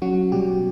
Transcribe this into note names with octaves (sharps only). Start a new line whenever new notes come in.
F#3 C#4 F#4
B2 G3 G4